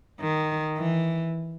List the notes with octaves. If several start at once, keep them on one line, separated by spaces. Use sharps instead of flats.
D#3
E3